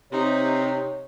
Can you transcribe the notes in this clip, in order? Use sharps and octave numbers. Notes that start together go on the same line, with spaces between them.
C3 D#4 C#5